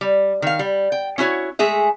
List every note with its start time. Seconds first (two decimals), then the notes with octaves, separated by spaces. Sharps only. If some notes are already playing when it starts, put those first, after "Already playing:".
0.01 G3
0.42 D#3 F5
0.59 G3
0.92 G5
1.18 C#4 E4 F#4 C#5
1.59 G#3 A3 G#4 E5